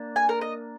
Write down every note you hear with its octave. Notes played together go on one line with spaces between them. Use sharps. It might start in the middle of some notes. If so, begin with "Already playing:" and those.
Already playing: A#3 D4
G#5
A#4
D#5